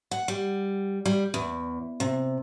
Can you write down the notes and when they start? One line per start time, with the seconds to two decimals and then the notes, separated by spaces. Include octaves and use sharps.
0.11 F#5
0.28 G3
1.06 G3
1.34 E2
2.00 C3